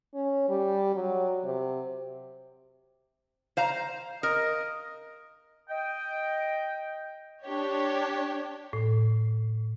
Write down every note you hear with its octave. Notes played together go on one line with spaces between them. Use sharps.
C#4
G3
F#3
C3
C5 F5 A#5
A#4 D#5
D#5 G5
D4 G4 C#5
A2